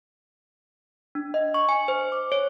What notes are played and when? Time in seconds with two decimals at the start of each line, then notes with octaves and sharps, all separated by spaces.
1.15 D4
1.34 D#5
1.54 C#6
1.69 G#5
1.88 C5
2.12 D6
2.32 C#5